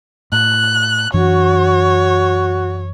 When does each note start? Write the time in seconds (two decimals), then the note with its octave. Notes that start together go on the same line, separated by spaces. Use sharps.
0.32 A2 F#6
1.14 F#2 E3 D4 F#4 C#5